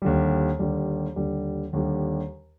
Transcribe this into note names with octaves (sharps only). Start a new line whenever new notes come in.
D#2 D3 G3
D#2 D3 G3
D#2 D3 G3
D#2 D3 G3